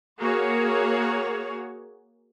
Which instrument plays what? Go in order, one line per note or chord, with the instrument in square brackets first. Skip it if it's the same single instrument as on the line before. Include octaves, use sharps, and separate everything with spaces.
[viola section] A#3 F#4 G#4 C#5